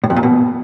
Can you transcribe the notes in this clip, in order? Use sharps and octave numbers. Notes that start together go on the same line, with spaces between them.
A2
F2
A#2
B2